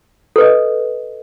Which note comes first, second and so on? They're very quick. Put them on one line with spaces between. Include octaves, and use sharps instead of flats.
A4 B4 D#5